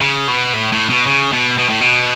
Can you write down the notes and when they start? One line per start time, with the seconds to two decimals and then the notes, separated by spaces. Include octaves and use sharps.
0.01 C#3
0.28 B2
0.54 A2
0.72 A2
0.89 B2
1.07 C#3
1.33 B2
1.59 B2
1.70 A2
1.81 B2